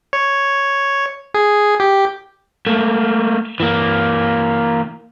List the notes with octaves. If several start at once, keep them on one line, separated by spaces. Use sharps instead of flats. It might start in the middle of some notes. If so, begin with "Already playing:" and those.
C#5
G#4
G4
A3 A#3
E3 A#3